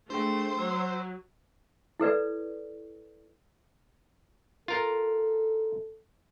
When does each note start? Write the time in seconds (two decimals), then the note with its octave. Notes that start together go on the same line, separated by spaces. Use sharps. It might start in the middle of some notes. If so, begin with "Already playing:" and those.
0.10 A3 D4 G#4 C5 G5
0.59 F#3 E6
2.00 E4 A4 B4 D5
4.68 F4 A4 A#4